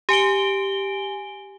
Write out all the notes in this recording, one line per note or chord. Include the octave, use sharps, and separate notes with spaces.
G4 G#5 D7 G7